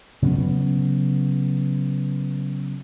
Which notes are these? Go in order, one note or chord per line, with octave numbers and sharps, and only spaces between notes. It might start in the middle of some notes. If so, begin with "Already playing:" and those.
C#3 F#3 B3